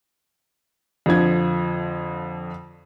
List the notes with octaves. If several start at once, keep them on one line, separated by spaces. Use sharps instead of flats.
F2 D3 F3 G#6